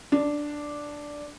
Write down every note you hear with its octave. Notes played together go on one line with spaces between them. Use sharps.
D4